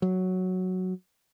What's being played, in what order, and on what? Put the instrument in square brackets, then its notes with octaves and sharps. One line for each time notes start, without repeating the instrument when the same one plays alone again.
[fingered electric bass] F#3